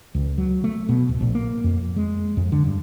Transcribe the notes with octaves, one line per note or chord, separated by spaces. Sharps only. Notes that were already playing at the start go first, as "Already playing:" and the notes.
C#2
F#3
A3
B2
D1
A#1
A#3
F2
G#3
F2
D3
G2